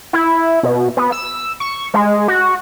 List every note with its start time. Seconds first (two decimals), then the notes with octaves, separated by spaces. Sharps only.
0.13 E4
0.63 B2
0.97 B3
1.12 E6
1.60 C#6
1.94 G#3
2.28 F#4